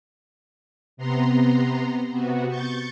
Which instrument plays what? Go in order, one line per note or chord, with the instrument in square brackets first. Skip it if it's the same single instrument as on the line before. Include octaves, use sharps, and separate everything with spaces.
[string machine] C3 B3 A#5 C6
C3 B3 F#4
C#6 G6 A6